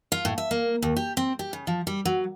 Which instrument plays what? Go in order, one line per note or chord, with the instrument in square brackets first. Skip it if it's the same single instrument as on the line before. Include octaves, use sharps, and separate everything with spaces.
[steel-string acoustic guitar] F4
A2
E5
A#3
D#2
G4
C4
G4
C#3
F3
G3
F#3